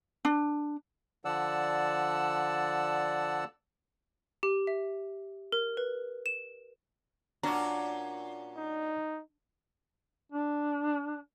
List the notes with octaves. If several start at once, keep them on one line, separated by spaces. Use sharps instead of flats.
D4
D3 F3 D5 F#5 A5 E6
G4
E5
A#4
B4
E7
A#2 C#4 D4 F#4 A#5
D#4
D4